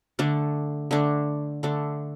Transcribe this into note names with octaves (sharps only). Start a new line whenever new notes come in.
D3 A3 D4
D3 A3 D4
D3 A3 D4